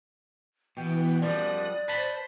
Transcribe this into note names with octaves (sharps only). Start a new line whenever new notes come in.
B2 E3 B3 G5
F#2 F3 G3 D5 D#6 F#6
B4 C5 A5 B5